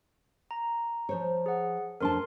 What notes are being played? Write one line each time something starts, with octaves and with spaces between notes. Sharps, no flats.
A#5
F3 C5 C#5
G#4 F#5
F2 D4 A#4 A5 C6